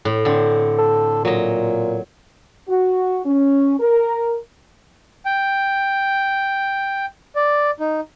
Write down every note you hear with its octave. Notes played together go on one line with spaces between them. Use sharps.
A2
D3 C4
A4
A#2 F#3 D#5
F#4
C#4
A#4
G5
D5
D#4